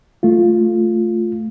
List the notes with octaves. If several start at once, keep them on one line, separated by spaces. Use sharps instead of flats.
A3 F4